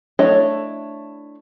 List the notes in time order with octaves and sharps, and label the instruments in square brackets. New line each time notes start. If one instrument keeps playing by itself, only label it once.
[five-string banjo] A3 D4 E4 C#5 D#5